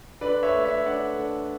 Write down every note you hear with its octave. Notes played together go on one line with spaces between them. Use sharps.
D3 B4 D5
C#5 E5
A3 D4
C#5 E5
D3 D5 F#5
A3 D4